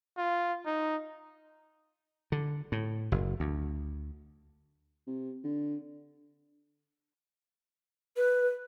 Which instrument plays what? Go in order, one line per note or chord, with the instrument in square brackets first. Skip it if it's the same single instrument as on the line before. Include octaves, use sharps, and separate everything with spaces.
[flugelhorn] F4
D#4
[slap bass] D3
A2
F#1
D2
[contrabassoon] C3
D3
[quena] B4